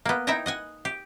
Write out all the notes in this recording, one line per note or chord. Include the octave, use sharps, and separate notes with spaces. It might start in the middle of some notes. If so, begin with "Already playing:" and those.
A#3 B3
D#4 E4 E5 G5 A#5
D#5 F#5 G#5
G4